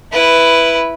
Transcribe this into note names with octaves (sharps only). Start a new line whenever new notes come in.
E4 B4